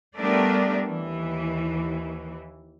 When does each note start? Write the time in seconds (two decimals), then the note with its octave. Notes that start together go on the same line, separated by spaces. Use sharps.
0.17 G3 A3 B3 D4 A#4 D5
0.88 D#2 E3